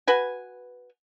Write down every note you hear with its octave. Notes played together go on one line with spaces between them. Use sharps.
F#4 B4 G#5